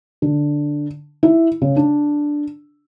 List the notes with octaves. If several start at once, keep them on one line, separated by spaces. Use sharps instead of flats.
D3
E4
C#3
D4